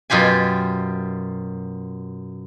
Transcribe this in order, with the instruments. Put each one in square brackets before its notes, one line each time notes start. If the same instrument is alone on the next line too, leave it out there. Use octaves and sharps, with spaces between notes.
[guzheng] F#2 B2 F4 G4 G#5